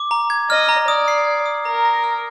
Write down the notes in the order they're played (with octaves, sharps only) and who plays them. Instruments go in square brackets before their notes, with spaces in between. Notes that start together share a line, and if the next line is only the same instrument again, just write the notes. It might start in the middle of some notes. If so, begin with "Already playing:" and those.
Already playing: [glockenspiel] D6
A#5
G#6
[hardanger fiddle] D#5 [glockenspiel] F6
[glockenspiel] A#5
[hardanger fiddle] D5 [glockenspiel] D#6
[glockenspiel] C7
G#6
D#6
[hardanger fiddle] A#4 [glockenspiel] A#5
[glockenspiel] A#6
F6